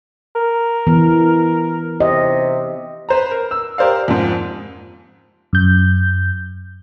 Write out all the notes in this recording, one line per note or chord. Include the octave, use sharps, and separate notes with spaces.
A#4
E3 B3
C3 D#5
B4 C5 A#5
A#4
E6
G4 A#4 C5 D5 F5
F2 G#2
F#2 G6